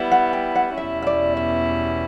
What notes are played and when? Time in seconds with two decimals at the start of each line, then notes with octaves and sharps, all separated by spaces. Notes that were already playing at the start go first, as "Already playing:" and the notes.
Already playing: G3 B3 E4
0.12 F#5
0.33 G5
0.55 F#5
0.77 E2 B2 G3 C#4 E4 E5
1.02 E5
1.07 D5
1.37 E5